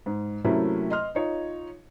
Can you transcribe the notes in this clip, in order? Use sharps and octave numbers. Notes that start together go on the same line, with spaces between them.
G#2
C3 F#3 A3 A#3 C#4 E4
D#5 C6 F6
D#4 F4 C#5